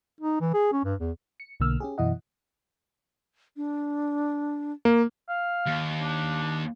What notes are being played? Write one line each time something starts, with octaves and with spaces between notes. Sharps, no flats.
D#4
E3
G#4
C#4
G2
E2
C#7
B1 B2 D3 A#3 E6 F6
C#4 G4 G#4
F#2 B2 E3 E4 D#5 F#5
D4
A#3
F5
D#2
D4